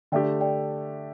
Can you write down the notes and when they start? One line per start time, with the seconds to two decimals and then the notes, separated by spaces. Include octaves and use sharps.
0.12 D3 A3 G4 D5 G5
0.41 D5 G5